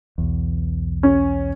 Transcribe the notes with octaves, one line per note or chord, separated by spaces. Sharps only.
B1 E2
C#4